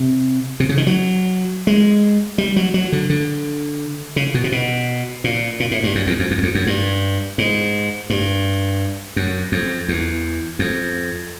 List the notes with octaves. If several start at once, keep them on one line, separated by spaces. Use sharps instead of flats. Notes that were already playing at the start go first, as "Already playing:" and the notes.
Already playing: C3
C3
C#3
D#3
F#3
G#3
G3
F#3
F#3
D3
D3
C#3
B2
C3
B2
A#2
A#2
A2
G2
F#2
E2
F2
F2
E2
F2
F#2
G2
G#2
G2
F#2
F2
E2
F2